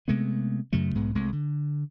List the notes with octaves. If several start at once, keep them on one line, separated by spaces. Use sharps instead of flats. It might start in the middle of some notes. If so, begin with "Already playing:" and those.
C3 G#3 A3 B3
F#2 C#3 F#3 A3
B1 G#2 G#3 B3
C2 G#3 A3 C4
D3